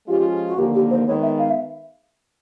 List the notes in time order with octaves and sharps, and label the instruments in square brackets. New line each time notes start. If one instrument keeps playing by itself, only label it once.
[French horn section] F3 G#3 C#4 F4 [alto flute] G4
[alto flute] F#4
[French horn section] D#2 D3 F3 A#3 [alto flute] G4
[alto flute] G4
C5
[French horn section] D#3 G#3 B3 [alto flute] C#5
[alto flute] E5
F5
E5